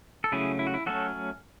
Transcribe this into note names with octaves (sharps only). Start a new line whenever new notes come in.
A4
C#3 F#3 A3 C#4 E4 G#4
E4
F#4
E4
F#3 A3 C#4 F#4 A4